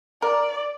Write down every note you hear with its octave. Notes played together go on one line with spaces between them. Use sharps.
A#4 D5